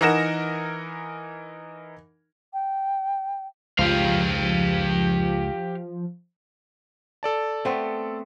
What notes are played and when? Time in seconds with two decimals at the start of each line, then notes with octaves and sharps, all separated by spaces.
0.01 E3 D#4 A#4 F#5 A#6 E7
2.53 G5
3.79 C#2 F3 G4 F5
7.23 A4 D5 A5
7.65 A3 B3 C4